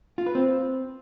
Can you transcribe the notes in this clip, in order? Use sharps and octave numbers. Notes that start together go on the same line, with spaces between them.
F4
B4
C4